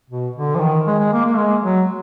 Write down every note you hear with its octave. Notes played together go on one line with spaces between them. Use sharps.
B2
D3
F3
D#3
G#3
G#3
A#3
A#3
G#3
F#3